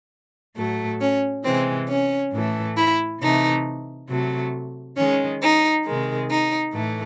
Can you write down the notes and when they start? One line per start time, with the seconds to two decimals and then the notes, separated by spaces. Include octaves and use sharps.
0.57 A2 F#3 A3
1.01 C#4
1.45 C3 E3 G#3 C4
1.89 C#4
2.33 A2 E3 A3
2.78 E4
3.21 C3 E3 A3 D#4
4.09 C3 F#3 A3
4.97 D#3 G#3 C#4
5.42 D#4
5.85 C3 D#3 G#3
6.29 D#4
6.74 A2 E3 A3